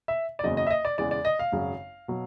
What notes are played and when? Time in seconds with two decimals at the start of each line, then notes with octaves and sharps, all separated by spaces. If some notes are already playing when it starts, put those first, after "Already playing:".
0.08 E5
0.39 D5
0.44 F#1 E2 C#3 F#3 D#5
0.57 D#5
0.67 E5
0.70 D#5
0.85 D5
0.98 E2 C#3 E3 G#3 D5
1.11 D5
1.25 D#5
1.39 F5
1.52 G#1 F#2 C#3 F#3
2.08 B2 F#3